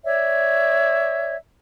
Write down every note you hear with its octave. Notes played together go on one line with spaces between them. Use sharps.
C#5 D5 E5